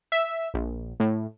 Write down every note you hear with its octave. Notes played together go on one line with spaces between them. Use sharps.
E5
A#1
A2